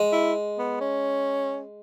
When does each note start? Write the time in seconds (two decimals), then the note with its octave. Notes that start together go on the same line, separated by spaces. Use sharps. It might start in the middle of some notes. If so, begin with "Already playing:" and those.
Already playing: G#3
0.12 E4
0.58 B3
0.81 C#4